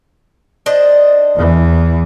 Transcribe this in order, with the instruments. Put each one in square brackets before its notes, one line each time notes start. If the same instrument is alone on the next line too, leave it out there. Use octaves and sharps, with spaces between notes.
[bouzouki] D4 C5 D#5
[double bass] E2 E3